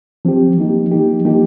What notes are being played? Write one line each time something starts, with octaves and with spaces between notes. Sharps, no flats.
F3 C4 G4
F3 A#3 D#4 G4
F3 A#3 D#4 G4
F3 A#3 D#4 G4